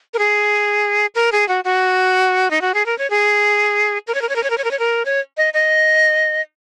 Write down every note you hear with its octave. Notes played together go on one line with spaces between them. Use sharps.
A#4
G#4
A#4
G#4
F#4
F#4
D#4
F#4
G#4
A#4
C#5
G#4
A#4
C#5
A#4
C#5
A#4
C#5
A#4
C#5
A#4
C#5
A#4
C#5
D#5
D#5